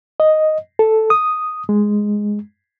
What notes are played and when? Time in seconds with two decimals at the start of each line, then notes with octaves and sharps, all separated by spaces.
0.20 D#5
0.79 A4
1.10 D#6
1.69 G#3